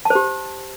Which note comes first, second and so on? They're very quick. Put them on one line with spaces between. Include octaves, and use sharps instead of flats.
A5 C5 G4